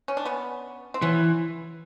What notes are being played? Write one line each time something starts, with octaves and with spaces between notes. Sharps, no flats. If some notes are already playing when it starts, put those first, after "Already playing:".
C#4
D4
B3 C#4
C4
E3 B3 C#4